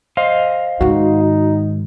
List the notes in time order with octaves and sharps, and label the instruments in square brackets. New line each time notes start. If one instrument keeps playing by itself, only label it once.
[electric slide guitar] C5 D#5 F5
[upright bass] G#2 D#3 [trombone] D#4 [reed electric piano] F#4